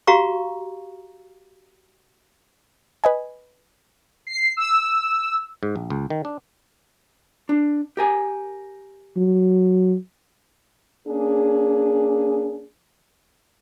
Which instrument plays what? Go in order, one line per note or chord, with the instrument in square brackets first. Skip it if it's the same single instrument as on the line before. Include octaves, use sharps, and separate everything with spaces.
[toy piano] F#4 G4 F5 A#5 C#6
[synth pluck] B4 D#5 G#5
[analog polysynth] C7
E6
[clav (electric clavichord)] G#2
A#1
C#2
D#3
D4
[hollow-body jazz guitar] D4
G4 A#4 G#5
[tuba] F#3
[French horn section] A#3 C#4 D4 G#4